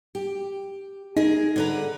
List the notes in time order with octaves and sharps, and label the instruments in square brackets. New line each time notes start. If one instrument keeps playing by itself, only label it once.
[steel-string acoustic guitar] G4
[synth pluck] D#4 [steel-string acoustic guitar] G#4 A#4
[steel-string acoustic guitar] D3 B4 A#5